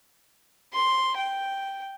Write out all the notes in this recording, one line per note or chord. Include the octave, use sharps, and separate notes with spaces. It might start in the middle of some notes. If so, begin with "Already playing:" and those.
C6
G5